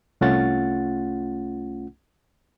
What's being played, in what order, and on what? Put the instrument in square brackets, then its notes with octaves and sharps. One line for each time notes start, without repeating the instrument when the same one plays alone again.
[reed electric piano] C2 A3 C#4 F4 F#5 A6